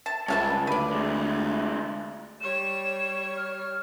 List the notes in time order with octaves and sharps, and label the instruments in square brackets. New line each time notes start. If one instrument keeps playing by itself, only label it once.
[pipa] A5
[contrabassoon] C#2 [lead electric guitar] G2 [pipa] C#4 F5 A5
[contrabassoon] D2 [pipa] B4 D5
[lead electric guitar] C3 G#3
[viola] G3 C#5 [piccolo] E7
[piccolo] F6